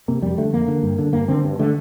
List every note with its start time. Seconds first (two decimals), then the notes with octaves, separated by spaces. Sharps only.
0.08 C3 A#3
0.22 F2 G3
0.38 D3 A3
0.53 F2 A#3
0.68 D3
0.83 G2
0.98 D3
1.13 G2 A#3
1.28 D3 C4
1.44 G2
1.59 D3 A3